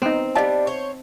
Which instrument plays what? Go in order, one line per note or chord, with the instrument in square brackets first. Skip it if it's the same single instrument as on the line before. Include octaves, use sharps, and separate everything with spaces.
[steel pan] B3 D#4 [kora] C4
[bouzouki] G3 D4 [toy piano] D#5 F5 A5
[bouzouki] C5 C#5